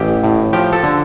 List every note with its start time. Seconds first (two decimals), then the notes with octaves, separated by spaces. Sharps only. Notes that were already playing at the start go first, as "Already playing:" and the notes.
Already playing: A1 G4
0.24 A2
0.53 F3 G4
0.73 A4
0.83 D3